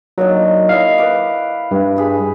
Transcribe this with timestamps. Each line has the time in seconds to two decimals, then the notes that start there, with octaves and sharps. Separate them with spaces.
0.18 F#3 A#3 D4 D#4
0.69 E4 D#5 F5
0.98 B4 D6
1.71 G2
1.97 G4 G#4 B5